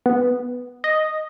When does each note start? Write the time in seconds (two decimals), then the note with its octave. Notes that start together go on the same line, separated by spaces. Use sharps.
0.06 B3
0.84 D#5